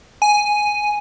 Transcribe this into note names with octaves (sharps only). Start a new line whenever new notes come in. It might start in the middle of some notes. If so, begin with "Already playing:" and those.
G#5